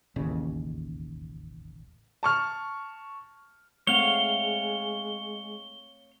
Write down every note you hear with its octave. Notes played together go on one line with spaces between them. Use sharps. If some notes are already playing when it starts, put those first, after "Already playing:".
E1 A1 D#2 C#3
A5 C#6 F6
G#3 A3 C4 C#5 F5 F#5 G7